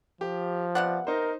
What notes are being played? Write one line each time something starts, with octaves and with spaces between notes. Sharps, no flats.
F3 G4
C3 B3 D5 F#5
D#4 A#4 C5